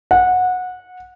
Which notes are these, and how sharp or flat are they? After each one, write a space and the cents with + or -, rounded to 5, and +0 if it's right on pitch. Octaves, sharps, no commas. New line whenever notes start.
F#5 -20